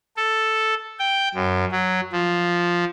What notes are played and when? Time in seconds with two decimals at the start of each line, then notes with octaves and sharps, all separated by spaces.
0.17 A4
0.99 G5
1.35 F#2
1.72 F#3
2.12 F3